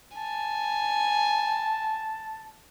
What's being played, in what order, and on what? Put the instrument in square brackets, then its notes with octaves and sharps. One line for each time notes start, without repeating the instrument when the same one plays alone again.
[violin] G#5 [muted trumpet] A5